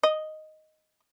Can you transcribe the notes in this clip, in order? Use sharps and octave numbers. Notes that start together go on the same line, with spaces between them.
D#5